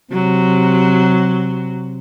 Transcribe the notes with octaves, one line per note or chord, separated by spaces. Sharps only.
C3 F#3